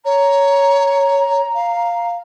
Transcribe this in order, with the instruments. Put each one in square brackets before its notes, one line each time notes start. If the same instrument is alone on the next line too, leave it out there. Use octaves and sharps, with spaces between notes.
[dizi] C#5 [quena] A#5
[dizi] F5